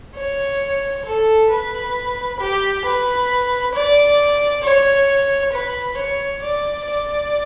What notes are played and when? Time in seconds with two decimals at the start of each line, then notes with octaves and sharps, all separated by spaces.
0.16 C#5
1.05 A4
1.50 B4
2.40 G4
2.84 B4
3.74 D5
4.63 C#5
5.53 B4
5.98 C#5
6.42 D5
6.86 D5